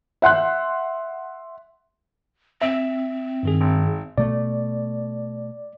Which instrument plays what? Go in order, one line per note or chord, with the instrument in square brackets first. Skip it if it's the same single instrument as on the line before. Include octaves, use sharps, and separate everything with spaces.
[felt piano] E5 F#5 C6 F#6
[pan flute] C4 [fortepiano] E5
[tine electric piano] G2 D#3 G#4
[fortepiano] G#1
[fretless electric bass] B2 A3 [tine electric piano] D5